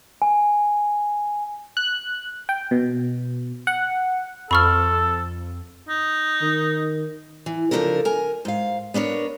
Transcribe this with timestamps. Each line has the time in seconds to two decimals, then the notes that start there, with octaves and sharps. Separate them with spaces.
0.22 G#5
1.77 F#6
2.49 G5
2.71 B2
3.67 F#5
4.51 F2 A4 B5 C#6 F6
5.89 D#4
6.42 D#3
7.46 E3
7.71 C#3 F3 G3 D4 A4 A#4
8.05 A#4 G#5
8.45 G#2 F5
8.94 B3 D4 A#4 C#5